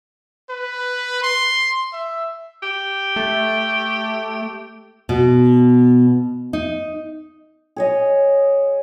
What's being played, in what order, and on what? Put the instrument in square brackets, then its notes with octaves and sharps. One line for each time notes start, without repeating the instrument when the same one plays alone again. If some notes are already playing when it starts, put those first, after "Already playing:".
[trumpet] B4
C6
E5
[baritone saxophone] G4
[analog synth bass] A3
[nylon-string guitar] B2
D#4
[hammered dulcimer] G#4 C#5 D#5